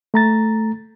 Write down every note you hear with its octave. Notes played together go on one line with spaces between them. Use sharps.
A3 A#5 A6